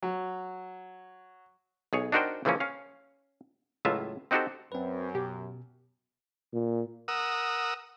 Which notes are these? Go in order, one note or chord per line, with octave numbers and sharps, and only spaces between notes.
F#3
B1 G#4 C#5
D4 D#4 F#4 A#4 C5 G5
C#3 E3 F3 A#3 C#4
C#4 F5
C#2 A2 F#3 F4 E5
C4 D#4 F#4 G4 A4 C5
F#2 C4 B4
B2 G4
A#2
A#4 F#5 D#6 E6